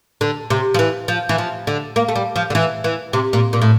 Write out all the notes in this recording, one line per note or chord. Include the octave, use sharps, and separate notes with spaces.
D3
C3
F3
E3
F3
E3
F3
D3
A#3
A3
G3
F3
D3
E3
E3
C3
A#2
A#2
A2